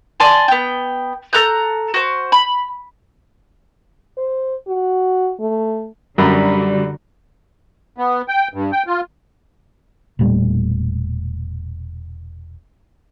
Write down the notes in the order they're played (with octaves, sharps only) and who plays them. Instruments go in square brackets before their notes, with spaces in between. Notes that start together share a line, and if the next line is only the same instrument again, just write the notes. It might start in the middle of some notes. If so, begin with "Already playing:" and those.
[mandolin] D5 G#5 A5 C6
B3 G5
A4 A#5 F#6 G6
F#4 C5
B5
[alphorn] C5
F#4
A3
[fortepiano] F#2 [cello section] D3 F#4 [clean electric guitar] G3 [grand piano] A#5 B5
[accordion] B3
G5
G2
G5
F4
[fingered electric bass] E1 A#2 G3 A3